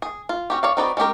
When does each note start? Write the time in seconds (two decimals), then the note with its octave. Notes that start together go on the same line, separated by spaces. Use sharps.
0.02 G#4
0.29 F4
0.50 C#4 F#4 G4
0.63 C#5 D5 F5
0.77 C4 D#4 F#4 B4 D5
0.97 G#3 C#4 G4 A#4